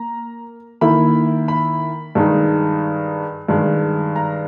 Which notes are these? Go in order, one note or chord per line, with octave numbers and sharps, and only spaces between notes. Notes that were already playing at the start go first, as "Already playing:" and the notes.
Already playing: A#3 A#5
D#3 A#3 E4 B5
B5
G2 D#3 G#3 D#4
G2 D#3 G#3
A#5